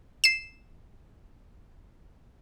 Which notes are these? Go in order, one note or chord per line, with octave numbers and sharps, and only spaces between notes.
C7 E7